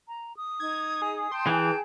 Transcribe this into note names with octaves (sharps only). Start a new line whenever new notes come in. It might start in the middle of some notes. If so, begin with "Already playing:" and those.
A#5
D#6
D#4 G#6
G#4
G5 A5 C6 G6
E3 G#4